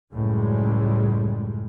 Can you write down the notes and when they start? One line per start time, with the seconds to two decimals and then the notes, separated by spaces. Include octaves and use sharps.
0.13 C#2 F#2 A2 G3 G#3